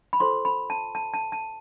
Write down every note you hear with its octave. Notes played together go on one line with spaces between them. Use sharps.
B5
F4 A4 C5 C6
B5
A5
A5
A5
A5